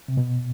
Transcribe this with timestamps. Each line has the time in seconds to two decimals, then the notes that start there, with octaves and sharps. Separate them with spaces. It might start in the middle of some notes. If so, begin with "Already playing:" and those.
0.08 C3
0.17 B2